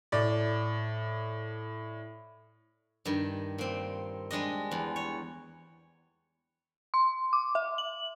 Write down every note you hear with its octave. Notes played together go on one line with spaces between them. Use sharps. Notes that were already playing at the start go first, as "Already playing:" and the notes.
A2 D5
G2 D#3
A#2 C4
G3 G#3 D4 D#5
E2
C#5
C6
D6
E5
F#7